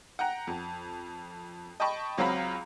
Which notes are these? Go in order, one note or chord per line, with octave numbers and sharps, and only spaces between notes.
F#5 G5 A#5
F2
D#5 G5 A5 B5 C#6
C#2 F#3 C4 F5 A#5 B5